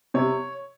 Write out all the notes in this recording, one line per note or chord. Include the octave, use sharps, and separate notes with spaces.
C3 C#5